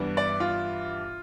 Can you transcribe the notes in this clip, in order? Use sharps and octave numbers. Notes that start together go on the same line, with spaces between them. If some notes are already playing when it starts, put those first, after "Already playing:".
Already playing: G2 E3 B3 D4
D5
F4